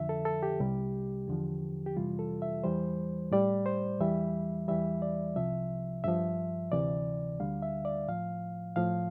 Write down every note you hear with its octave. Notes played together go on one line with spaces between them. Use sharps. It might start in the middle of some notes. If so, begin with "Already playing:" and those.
Already playing: F2 D3 F3 E5
A4
A4
G4
C2 C3 G3
E2 D3 F3
G4
F2 C3 E3 G3 F4
A4
E5
E2 E3 G3 C5
A2 G3 D5
C5
E2 E3 G3 E5
E2 E3 G3 E5
D5
C2 C3 F3 E5
G2 F3 E5
D2 C3 E3 D5
D2 D3 G3 F5
E5
D5
A2 F3 F5
A2 F3 F5